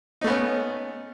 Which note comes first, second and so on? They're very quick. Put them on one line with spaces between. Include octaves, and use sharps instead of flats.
D#4 A3 B3 C#4